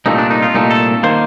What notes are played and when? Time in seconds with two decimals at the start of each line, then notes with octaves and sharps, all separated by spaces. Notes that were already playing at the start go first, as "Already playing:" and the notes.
0.06 C2 A#2 A3 D#4
0.18 D4
0.31 D#4
0.42 F4
0.54 C2 A#2 A3 D#4
0.71 A4
1.03 D#3 A#3 C5